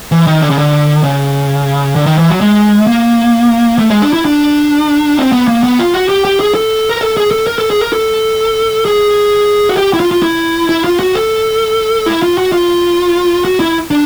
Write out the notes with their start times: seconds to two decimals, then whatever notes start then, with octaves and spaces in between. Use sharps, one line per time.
0.12 E3
0.27 D#3
0.42 D3
0.50 C#3
0.59 D3
1.04 C#3
1.96 D3
2.06 D#3
2.18 E3
2.30 F#3
2.41 G#3
2.87 A#3
3.79 A3
3.90 G#3
4.02 D4
4.13 E4
4.25 D4
5.17 C4
5.32 B3
5.48 A#3
5.63 B3
5.79 F4
5.94 F#4
6.09 G4
6.25 G4
6.40 G#4
6.55 A4
6.89 A#4
7.01 A4
7.17 G#4
7.31 A4
7.47 A#4
7.59 A4
7.70 G#4
7.82 A#4
7.93 A4
8.85 G#4
9.69 F#4
9.77 G4
9.93 E4
10.00 F4
10.11 F4
10.23 E4
10.69 E4
10.84 F4
10.99 F#4
11.15 A4
12.06 E4
12.23 F4
12.38 F#4
12.52 F4
13.45 F#4
13.60 E4
13.91 D4